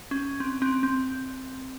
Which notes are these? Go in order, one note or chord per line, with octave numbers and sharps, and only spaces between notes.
C#4
C4
C4
C4